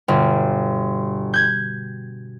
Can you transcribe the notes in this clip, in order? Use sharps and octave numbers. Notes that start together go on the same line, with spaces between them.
G1 B2
G6 G#6